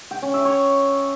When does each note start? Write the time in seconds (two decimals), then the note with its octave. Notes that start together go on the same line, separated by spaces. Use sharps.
0.11 G5
0.22 C#4
0.34 E5
0.45 C#5